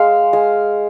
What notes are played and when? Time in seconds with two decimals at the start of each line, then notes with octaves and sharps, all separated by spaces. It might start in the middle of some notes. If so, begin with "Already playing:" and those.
Already playing: G#3 F5
0.33 G#3